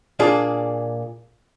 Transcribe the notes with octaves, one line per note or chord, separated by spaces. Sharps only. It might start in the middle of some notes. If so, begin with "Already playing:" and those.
A#2 A#3 D4 F4 G#4